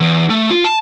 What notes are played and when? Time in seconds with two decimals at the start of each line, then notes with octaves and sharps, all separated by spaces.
0.01 E2
0.30 A3
0.51 F4
0.64 A5